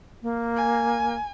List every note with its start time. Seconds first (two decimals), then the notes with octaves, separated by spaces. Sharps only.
0.22 A#3
0.57 G#5